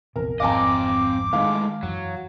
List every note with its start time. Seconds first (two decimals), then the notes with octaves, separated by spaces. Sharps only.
0.16 A#1 E2 C3 A#4
0.40 G#1 F2 C4 D#5 F5 G#5 A#5 D6
1.33 A2 D#3 G#3 F5
1.83 F#2 E3 F#3